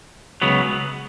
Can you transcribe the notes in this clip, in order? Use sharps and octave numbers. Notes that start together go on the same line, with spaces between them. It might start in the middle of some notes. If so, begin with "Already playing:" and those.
C#2 C#3 F#3 B3